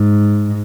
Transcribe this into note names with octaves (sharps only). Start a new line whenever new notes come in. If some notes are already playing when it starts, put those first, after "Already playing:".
Already playing: G#2